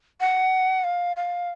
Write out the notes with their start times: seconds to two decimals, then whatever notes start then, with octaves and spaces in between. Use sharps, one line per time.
0.20 F#5
0.84 F5
1.17 F5